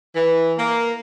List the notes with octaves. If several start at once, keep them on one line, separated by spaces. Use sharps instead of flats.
E3
A#3